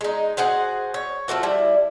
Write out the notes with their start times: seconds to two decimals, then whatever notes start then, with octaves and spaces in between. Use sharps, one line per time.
0.01 G#3 D#4
0.37 F#4 G#4 C5 F#5
0.94 C#5
1.28 F3 A3 B3 F#4
1.43 G3 E4